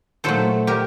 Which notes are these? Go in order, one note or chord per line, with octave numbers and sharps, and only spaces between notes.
A#2 F#3 A3 A4 C5
G4 A#4